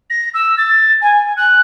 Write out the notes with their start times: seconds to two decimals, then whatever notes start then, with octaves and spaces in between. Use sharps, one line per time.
0.10 A#6
0.34 E6
0.58 A6
1.01 G#5
1.37 F#6